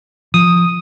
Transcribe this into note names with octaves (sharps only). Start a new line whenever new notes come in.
F3 D#6